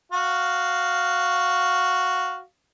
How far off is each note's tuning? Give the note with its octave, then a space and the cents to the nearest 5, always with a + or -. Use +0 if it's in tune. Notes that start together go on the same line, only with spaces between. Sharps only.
F#4 +0 F5 +0